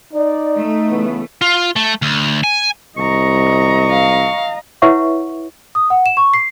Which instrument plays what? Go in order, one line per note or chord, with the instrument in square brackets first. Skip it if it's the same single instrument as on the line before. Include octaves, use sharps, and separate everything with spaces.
[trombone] D#4 [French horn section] D5
[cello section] A3
[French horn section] C#3 E3 B3
[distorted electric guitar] F4
A3
D2
G#5
[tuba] C2 [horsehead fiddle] D#5 A#5 [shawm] C#6
[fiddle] F5
[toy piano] E4 B4 C#5 E5 F#5 C#6
[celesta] D#6
F#5
E7
C#6
C7